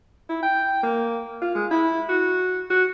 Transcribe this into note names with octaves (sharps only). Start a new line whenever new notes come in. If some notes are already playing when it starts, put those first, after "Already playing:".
E4
G5
A#3
F4
G#3
E4
F#4
F#4